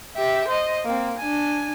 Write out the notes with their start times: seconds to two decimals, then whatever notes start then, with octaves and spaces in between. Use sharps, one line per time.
0.16 G4 E5
0.48 C5 D#5
0.85 A#3 C4
1.18 D4 G#5